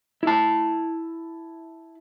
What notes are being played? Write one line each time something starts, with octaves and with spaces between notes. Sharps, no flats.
E4 A5